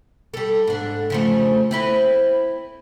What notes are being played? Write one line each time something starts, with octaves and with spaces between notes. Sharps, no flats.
G3 A4
G#2 D4
C#3 F3 A3
C4 E4 B4